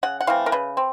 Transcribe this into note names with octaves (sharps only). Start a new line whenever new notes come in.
C#3 F#5
F#5
E3 A3 C4 F5
A#4
C#3 B4
C4